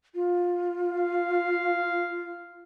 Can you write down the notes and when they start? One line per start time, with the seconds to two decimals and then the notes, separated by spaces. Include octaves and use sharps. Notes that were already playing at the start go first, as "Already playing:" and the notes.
0.15 F4
0.91 F5